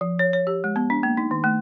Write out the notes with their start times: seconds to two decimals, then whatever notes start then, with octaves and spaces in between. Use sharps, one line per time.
0.01 F3
0.19 C#5
0.33 C#5
0.47 G4
0.64 G#3
0.76 B3
0.90 D4
1.03 A#3
1.17 D#4
1.31 D#3
1.44 A3